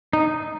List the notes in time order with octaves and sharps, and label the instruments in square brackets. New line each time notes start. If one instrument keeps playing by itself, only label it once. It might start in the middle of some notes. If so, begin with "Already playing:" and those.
[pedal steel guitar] D#4